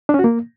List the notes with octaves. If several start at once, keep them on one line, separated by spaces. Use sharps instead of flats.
D4
C#4
F#4
A#3